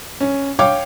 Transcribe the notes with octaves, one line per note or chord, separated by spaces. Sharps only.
C#4
C#5 F5 G5 D6